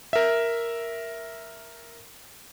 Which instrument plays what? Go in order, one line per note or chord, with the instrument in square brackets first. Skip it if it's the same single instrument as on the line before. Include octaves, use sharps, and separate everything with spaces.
[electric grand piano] A#4 E5